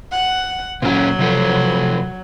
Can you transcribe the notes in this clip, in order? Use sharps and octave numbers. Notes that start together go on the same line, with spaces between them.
F#5
A#2 F#3 C#4
C3 F3 A4